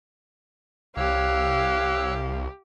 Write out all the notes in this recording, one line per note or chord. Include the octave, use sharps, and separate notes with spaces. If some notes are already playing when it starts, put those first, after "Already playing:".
C2 G4 C#5 F5 E6 F#6